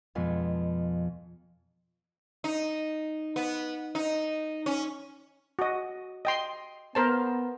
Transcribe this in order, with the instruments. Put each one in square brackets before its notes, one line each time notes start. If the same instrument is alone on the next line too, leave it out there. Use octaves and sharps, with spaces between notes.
[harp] F2 B2 F3 G#3 B3
[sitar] D#4
B3
D#4
C#4
[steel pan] F#4 D#5
D#5 G5 C6
[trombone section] B3 [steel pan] A#4 C5 A5